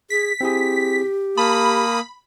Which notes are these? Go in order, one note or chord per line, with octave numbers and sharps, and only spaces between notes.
G#4 B6
C4 E4 G4 G#4
A#3 A5 B5 D#6